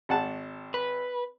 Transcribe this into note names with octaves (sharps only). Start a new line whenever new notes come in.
G#1 F#5 A5
B4